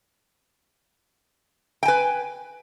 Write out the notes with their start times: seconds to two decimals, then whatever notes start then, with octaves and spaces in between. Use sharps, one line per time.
1.83 G5
1.85 G#5
1.88 B4